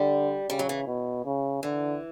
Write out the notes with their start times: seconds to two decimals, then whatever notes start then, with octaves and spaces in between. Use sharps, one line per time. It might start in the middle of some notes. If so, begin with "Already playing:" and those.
Already playing: D3 G3
0.50 C#3 G3
0.59 F#3
0.69 E3
0.87 B2
1.25 C#3
1.63 D3 E3